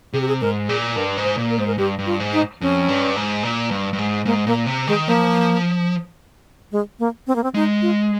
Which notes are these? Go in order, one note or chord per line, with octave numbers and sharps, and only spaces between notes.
C3 G#4
G4
G#4
G#2 A#4
A#2 G#4
G2 A#4
G#2
C5
A#2
A#4
G#2 C5
A#4
G2 G4
G2
F4
G#2
D#4
F2 C#4
G2
G#2
A#2
G2
G2
G#2
G#2 A#3
A#2 A#3
C3
D#3 G#3
F3 A#3
G#3
A#3
C4
A#3
C4
G#3 D#4
F4